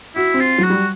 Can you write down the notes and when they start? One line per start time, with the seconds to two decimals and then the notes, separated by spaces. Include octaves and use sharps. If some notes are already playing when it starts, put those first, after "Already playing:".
0.16 E4 F#4
0.34 C4
0.40 F4
0.58 F#3
0.64 F#4
0.70 G3